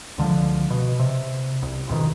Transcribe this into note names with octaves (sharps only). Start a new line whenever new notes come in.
C#2 D3 F3
B2
C3
C2
A1 F2 B2 D#3